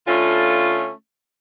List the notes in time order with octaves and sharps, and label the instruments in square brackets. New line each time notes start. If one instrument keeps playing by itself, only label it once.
[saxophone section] D3 A3 C#4 F4